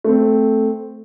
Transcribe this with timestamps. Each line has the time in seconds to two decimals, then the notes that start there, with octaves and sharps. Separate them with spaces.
0.04 A3 C4